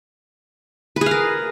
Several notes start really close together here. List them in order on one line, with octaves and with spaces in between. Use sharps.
B4 G#4 F5 A#4